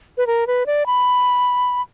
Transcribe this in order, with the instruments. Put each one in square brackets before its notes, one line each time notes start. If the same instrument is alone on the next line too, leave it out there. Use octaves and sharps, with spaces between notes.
[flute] B4
A#4
B4
D5
B5